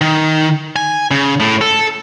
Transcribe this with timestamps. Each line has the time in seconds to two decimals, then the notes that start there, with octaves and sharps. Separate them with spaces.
0.01 D#3
0.76 G#5
1.11 C#3
1.40 A2
1.61 A4